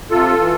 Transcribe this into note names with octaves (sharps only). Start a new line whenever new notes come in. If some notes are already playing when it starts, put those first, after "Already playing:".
C3 F4 A4
E3